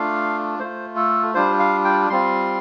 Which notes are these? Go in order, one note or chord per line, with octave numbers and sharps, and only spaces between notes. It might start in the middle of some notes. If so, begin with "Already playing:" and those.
Already playing: A3 D4 F4 F5
A3 F4 C5
A4
G3 D4 F4 C5
F5
G5
G3 C4 F4 C6